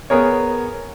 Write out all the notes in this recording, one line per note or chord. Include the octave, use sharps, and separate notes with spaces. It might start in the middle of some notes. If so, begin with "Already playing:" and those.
B3 G#4 A#4 C#5